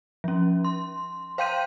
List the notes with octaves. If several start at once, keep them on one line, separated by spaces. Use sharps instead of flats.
F3 C#4
C6
C5 F5 G5 C6 G6 D#7